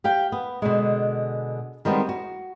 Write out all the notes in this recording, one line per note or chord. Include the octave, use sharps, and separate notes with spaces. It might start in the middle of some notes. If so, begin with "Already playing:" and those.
G4 F5 G5
B3
B2 D3 G#3
D#3 G3 G#3 B3 C4
F#4